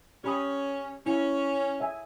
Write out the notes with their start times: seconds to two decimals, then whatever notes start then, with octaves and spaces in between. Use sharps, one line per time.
0.24 C#4 G4 B5 D#6
1.06 C#4 E4
1.80 E5 G#5